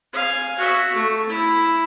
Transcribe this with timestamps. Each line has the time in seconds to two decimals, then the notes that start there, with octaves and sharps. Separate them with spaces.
0.13 F5 G#5
0.59 F#4 E5
0.94 A3
1.29 E4